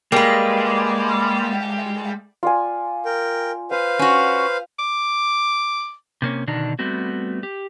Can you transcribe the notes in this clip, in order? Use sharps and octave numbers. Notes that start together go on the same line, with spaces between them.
G3 G#3 A#3 B4
F4 D5 G#5
A#4 G5
B4 C5 F5 D#6
C#4 F#4
D6
C3 A#3 C#4
B2 D3 D#3 D4 D#4
G3 A3 B3 C4 F#4
G4